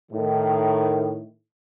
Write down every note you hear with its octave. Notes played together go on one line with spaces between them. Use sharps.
A2 D#3